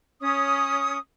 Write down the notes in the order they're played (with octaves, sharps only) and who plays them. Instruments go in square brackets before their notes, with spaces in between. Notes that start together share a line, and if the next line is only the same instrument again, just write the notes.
[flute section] C#4 D#6